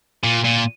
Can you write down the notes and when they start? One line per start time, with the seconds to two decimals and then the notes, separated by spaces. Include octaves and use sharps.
0.24 A#2
0.44 A#2